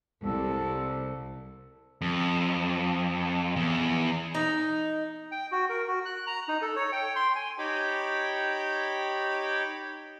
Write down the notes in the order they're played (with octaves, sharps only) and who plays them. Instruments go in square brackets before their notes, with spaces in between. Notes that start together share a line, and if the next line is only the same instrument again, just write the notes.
[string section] C2 [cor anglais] A4
[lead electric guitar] F2
E2
[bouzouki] D#4
[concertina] G5
F#4
A#4
F#4
F#6
A#5
D#4
A4
C#5
G5
C6
G#5
[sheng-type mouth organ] D#4 G4 C#5 G5 B5 D6